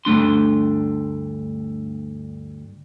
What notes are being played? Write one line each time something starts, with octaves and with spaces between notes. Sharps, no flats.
D2 G2 A3 D4 C6